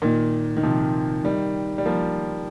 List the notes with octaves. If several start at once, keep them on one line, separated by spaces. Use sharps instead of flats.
A#2 D#3
D#3
C3 F3
D#3 G3
G3
F3 A#3